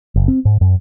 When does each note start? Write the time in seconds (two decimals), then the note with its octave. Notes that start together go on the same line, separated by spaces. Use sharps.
0.16 F#1
0.28 C4
0.45 G#2
0.61 F#2